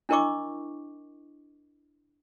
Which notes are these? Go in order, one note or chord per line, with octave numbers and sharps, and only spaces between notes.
D4 E4 A#4 D#5 C#6 D6